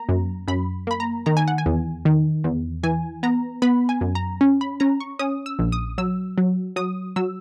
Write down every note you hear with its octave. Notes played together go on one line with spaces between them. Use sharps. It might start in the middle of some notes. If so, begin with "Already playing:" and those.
Already playing: A#3 A#5
F#2
F#2 B5
A#3 B5
A#5
D#3 A#5
G#5
F#5
G#5
E2
D#3
E2
E3 G#5
B3 A#5
B3 B5
G#5
F#2
A#5
C#4
B5
C#4 A#5
C#6
C#4 D#6
E6
A#1
D#6
F#3 E6
F#3
F#3 D#6
F#3 E6